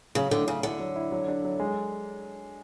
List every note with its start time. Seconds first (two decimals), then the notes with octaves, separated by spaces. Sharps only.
0.15 C#3 F#3
0.31 A2 D3
0.48 C#3 C#4
0.63 D3 E4
0.79 F#3
0.96 E4
1.11 F#3
1.28 D4
1.44 F#3
1.60 G#3